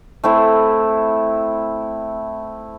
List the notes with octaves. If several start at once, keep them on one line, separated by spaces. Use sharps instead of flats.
A3 C4 E4